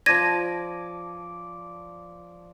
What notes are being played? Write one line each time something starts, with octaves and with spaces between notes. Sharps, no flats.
F3 D5 G#6 A#6 D#7